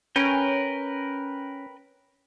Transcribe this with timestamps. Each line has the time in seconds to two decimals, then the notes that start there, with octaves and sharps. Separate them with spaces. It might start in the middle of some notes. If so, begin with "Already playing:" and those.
0.16 C#4 A#4 B4 G5